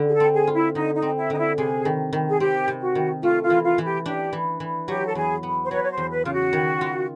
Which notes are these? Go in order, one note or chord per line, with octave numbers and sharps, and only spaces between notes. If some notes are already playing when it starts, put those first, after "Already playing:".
Already playing: D3
G#4
A4
C4
G#4
F4
E4
D3 D#4
D#4
C4
E4
D3 D#4
E4
C3 G#4
D#3
D#3
G#4
C4 G4
C3
F#4
D#3
A3 F4
F4
E3
F4
E3
G4
D4 G4
E3
E3
F#3 G4
A4
E2 G#4
B3
C5
F#3 B4 C#5
C#5
C5
E2
B4
C#3 F4
F#4
D#3
F4